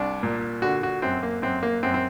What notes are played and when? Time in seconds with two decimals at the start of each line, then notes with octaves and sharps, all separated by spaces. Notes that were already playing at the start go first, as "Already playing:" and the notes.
Already playing: C2 D4
0.23 A#2
0.62 D3 F#4
0.83 F#4
1.02 F#2 C4
1.23 A#3
1.42 F#2 C4
1.63 A#3
1.83 F#2 C4
1.94 C4